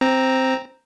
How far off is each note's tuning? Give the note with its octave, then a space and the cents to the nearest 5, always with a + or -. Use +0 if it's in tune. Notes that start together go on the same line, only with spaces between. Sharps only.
C4 +0 A#5 +0